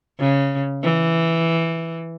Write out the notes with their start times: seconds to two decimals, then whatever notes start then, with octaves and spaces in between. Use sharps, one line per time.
0.19 C#3
0.83 E3